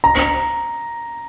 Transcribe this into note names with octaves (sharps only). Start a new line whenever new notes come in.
A#5